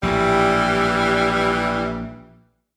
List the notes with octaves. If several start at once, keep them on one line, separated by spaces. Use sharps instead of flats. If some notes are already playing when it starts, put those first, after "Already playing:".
A#1 A2 E3 G3